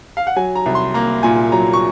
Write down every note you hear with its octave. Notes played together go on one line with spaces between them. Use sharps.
F5
F#5
F#3 G#5
A#5
C2
C6
A#3 A#5
A#2 G#5
F#3 A#5
C#6